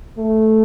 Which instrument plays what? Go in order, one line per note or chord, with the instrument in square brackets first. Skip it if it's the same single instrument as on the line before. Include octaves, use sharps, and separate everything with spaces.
[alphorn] A3